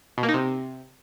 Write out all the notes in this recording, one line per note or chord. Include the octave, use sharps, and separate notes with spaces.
B2
A#3
D#4
C3